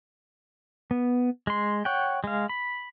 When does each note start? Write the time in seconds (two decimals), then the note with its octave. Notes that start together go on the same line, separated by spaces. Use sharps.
0.91 B3
1.47 G#3 C6
1.85 C#5 F#5 G5
2.24 G#3 F5
2.49 B5